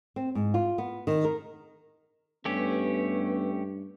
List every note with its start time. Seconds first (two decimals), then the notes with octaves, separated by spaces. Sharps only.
0.16 C4
0.35 G#2
0.54 F4
0.78 B3
1.07 D#3
1.24 A#4
2.45 G2 A3 B3 C#4 G4